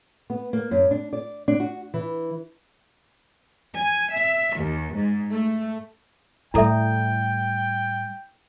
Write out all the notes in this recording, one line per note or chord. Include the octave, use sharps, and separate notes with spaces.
B3
A#3
F#2
D4
D5
D4
F#4
E3
G#5
E5
D#2
G#2
A3
A2 G3 E4 A4 E5 G5